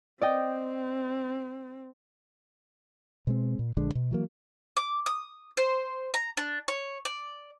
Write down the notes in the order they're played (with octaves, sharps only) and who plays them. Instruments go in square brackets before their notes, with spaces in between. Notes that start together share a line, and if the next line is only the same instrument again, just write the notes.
[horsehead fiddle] C4 [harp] D5 D#5 G5
[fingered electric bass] B2 G#3 C4
A#2
A#1 D3 G#3 D4
B2
E3 F#3 A#3
[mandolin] D6
D#6
C5
A#5
D4
C#5
D5